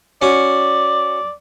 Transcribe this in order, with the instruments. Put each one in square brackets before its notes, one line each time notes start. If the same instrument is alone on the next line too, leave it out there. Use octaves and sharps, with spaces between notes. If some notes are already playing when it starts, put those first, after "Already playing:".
[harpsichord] C#4 F#4 [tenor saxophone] D5